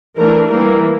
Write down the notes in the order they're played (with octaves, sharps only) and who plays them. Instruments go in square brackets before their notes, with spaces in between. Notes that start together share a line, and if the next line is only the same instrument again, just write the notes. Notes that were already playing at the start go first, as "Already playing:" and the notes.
[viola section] E3 A3 D4 A#4
E3 G3 A#3 A#4